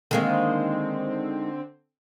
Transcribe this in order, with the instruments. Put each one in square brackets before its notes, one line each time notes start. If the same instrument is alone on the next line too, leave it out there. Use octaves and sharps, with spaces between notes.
[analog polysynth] D3 C4 [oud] D#3 G#3 A#3